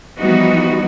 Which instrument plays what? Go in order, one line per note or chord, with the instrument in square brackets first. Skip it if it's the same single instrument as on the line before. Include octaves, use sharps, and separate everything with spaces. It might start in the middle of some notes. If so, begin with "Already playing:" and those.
[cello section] E3 F3 G3 B3 D#4 F#4